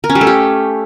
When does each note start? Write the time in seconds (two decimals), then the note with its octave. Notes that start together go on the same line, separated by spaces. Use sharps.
0.04 A#4
0.10 C#4
0.15 G3
0.21 A3
0.27 G4